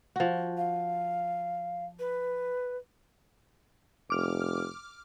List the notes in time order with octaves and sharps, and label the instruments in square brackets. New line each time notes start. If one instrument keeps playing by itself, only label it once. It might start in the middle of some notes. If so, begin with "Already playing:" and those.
[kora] F3 F#4
[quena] F5
B4
[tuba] F1 [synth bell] D6 F6